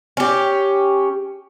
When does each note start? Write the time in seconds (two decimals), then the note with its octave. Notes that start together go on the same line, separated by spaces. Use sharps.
0.17 C#4 G4